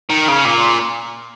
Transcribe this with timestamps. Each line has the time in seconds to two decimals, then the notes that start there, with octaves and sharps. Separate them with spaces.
0.10 D#3
0.28 C#3
0.45 A#2